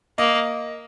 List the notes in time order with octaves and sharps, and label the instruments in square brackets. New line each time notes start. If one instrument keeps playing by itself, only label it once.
[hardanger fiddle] A#3 [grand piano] D#5